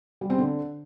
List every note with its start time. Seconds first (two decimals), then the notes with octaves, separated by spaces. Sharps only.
0.21 G3
0.30 C4
0.38 D3